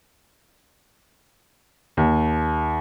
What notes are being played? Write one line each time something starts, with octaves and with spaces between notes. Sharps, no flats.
D#2